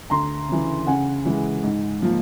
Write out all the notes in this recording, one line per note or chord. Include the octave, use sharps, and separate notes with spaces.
D2 A#5 C6
C#3 E3
C#3 F#5 G#5
E3 G#3
G#2
F3 A#3